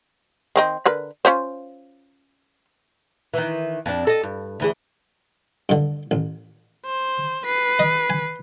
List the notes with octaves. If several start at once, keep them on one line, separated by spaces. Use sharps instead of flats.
D#3 C4 D#5
D3 A#4 B4
C#4 F4 C5
D#3 E3
F2 D4
A4 D#5
G2
D2 E3 G#4
G2 D3
A1
C5
B4 C7
D#5
G#5